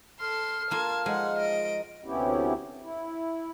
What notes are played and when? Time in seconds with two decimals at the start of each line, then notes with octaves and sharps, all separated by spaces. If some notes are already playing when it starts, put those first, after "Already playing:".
0.20 A4 C6 F6
0.71 A#3 F4 A5 G#6
1.06 F3 G#3 D#4 F#5
1.39 D#5 D7
2.05 D2 C3 B3 C#4 E4 G4
2.83 E4